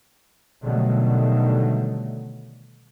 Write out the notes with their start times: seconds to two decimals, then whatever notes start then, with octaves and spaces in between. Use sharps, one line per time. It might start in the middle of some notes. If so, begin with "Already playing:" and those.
0.63 B2 D3 D#3 F#3 G3 A3